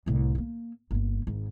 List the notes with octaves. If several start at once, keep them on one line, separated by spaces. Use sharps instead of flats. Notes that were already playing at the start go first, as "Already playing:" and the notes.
C2 A2
A3 A#3
G1 A#3
G#1